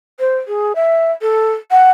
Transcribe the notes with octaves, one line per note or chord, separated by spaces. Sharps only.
C5
G#4
E5
A4
F#5